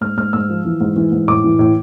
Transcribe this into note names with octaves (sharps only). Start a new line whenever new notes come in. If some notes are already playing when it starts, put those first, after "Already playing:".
G#2 F6
G#2 F6
G#2 E6
F3
E3
G#2
E3
G#2
A2 D6
E3
A2